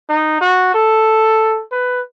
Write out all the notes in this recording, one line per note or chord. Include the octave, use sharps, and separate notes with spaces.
D#4
F#4
A4
B4